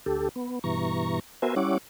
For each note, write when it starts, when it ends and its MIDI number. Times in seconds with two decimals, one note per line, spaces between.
0.06 0.29 38
0.06 0.29 67
0.06 0.29 69
0.36 0.59 59
0.64 1.20 43
0.64 1.20 47
0.64 1.20 52
0.64 1.20 82
0.64 1.20 85
1.42 1.55 59
1.42 1.55 66
1.42 1.55 70
1.42 1.55 72
1.42 1.55 76
1.42 1.55 80
1.56 1.78 55
1.56 1.78 61
1.56 1.78 64
1.56 1.78 73
1.56 1.78 78
1.56 1.78 86